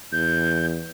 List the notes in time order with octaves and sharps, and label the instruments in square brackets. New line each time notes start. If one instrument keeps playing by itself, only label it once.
[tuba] E2 [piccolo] G6